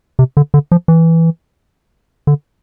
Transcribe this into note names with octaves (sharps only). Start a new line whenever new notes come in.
C3
D3
D3
F3
E3
D3